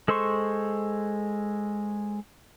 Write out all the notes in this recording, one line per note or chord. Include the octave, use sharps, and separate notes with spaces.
G#3 A4 C5 C6 C#6